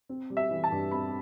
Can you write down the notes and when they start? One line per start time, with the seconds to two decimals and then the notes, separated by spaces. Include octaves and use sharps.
0.09 C4
0.30 G3
0.37 E5
0.51 E3
0.64 A5
0.72 G2
0.91 C4 B5